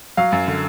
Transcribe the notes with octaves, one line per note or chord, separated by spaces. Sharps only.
F#3 F5
F#2
D3